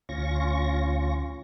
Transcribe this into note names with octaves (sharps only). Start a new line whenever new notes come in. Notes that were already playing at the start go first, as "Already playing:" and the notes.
D2 C#4 F4 C#6 A#6